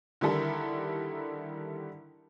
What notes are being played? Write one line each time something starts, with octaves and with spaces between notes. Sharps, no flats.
D3 D#3 G3 E4 A4 A#4